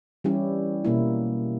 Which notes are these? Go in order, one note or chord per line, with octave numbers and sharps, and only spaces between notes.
E3 G3 C#4 E4 G4
B2 A#3 E4